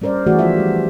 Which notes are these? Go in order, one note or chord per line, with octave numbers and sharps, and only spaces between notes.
G3 C#4 A#4 C5 D5
E3 A3 F#4 G#4 D5
F3 B3 F4 C5 E5
G3 G4